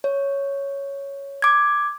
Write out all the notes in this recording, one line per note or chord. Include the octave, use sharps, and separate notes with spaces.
C#5
D6 G#6